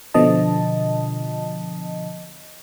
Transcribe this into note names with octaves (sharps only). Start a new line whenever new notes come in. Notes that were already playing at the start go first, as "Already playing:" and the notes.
B2 D3 F3 D#5 A5